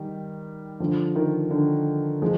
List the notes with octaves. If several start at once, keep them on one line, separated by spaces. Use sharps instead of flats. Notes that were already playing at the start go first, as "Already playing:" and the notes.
Already playing: D#3 G3
D3 F3
D#3
D3
F3 G#3